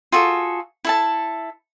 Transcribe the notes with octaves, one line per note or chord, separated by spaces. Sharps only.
F4 F#4 G#4 A4
E4 A4 A5